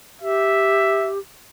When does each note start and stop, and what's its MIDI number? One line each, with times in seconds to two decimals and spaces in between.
0.22 1.19 67
0.22 1.09 76